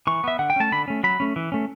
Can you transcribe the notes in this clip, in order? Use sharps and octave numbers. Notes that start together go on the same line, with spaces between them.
E3 C#6
B3 E5
D3 F#5
G5
A3 C#4 A5
D3 B5
A3 C#4
F#3 B5
A3 C#4
E3
A3 C#4